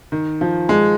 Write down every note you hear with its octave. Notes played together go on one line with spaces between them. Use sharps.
D#3
F3
G#3